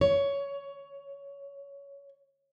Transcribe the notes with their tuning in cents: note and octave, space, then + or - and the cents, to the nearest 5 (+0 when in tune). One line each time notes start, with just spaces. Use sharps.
C#5 +15